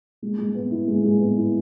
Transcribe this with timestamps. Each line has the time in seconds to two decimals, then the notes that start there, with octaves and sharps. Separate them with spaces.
0.22 G#3
0.38 G#3
0.55 B3
0.71 E4
0.87 G#3
1.04 G#3
1.20 B3
1.37 E4